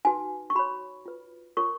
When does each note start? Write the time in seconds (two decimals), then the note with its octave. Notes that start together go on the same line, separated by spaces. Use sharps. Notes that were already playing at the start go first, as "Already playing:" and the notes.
0.05 D#4 F#4 B4 G#5
0.50 C#6
0.55 F#4 C#5 B5
1.06 F4 B4
1.57 F4 A#4 C#5 C#6